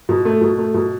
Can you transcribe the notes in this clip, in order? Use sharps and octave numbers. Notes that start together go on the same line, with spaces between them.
B2
A3
B2
A3
B2